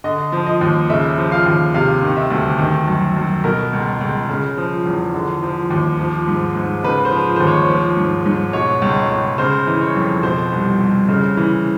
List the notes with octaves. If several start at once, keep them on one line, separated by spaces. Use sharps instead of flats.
D3 D#5
F3
D#5
D#2
C#3 E5
F3
F5
D#2
C3 F5
D#3
E5
D2
D#3
F#2
F#2
B2 A#4
C#2
C#2
C#3
F3
E2
D3
F3
D#2
F3
G#2
G#2
C#3 B4
C5
F3
D#2 C5
C#5
F3
G#2
G#2
B2 C#5
C#2
C#5
C#2
C#3 C5
E3
C#5
F2
B2 C5
C2
C2
C#3
E3